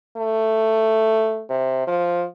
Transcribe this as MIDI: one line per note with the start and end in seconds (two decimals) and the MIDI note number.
0.17 1.43 57
1.50 1.87 48
1.87 2.25 53